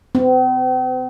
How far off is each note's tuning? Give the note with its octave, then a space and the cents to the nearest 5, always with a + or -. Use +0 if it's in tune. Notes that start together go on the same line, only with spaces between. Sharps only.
C4 -45